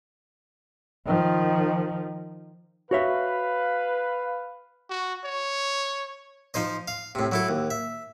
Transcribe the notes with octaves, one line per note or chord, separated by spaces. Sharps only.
D#3 F3
F#4 B4 C#5 E5 F5
F#4
C#5
F3 D#4 C5 D#5
F5
A2 C3
F#3 E4 A4
D#2
E5